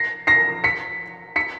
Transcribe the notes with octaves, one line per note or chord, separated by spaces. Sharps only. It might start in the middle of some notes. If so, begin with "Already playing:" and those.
Already playing: A#6 C7
A#6 C7
B6 C#7
B6 C#7